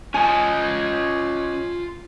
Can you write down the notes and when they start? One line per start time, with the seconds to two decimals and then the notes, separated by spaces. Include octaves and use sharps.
0.14 C#4 F4 D#5 G#5 A5